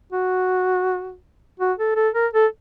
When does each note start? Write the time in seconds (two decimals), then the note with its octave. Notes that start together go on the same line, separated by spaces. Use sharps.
0.12 F#4
1.59 F#4
1.78 A4
1.96 A4
2.14 A#4
2.33 A4